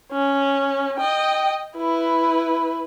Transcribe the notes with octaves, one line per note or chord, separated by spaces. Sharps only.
C#4
D#5 G5
E4 B4